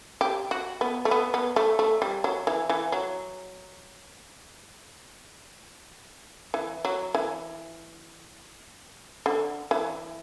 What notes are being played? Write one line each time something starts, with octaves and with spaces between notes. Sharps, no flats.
G4
F#4
B3
A3
B3
B3
A3
A3
G3
F#3
E3
E3
F#3
E3
F#3
E3
D3
E3